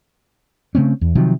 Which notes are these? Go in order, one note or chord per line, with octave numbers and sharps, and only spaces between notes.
C#3 A3 C4 C#4
E2
C3 D#3 F3 F#3